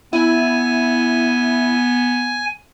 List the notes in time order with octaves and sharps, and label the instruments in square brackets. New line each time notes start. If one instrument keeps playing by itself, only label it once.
[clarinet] B3 [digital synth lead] E4 [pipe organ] G#5